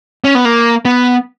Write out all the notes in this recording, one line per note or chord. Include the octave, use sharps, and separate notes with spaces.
C#4
B3
A#3
B3